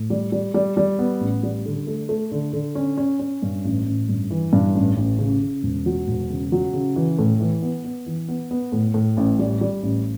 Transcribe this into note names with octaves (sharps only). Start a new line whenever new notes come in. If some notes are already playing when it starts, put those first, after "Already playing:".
Already playing: A2
G3
G3
G3
G3
B3
A1
G3
D3
A3
A3
D3
D3
C#4
C#4
C#4
G2
A1
A1
G2
E3
G2
A1
A1
C#3
C#3
E1
F#3
E1
C#3
F#3
C#3
E3
A2
E3
B3
B3
E3
B3
B3
A2
A2
A1
G3
G3
A1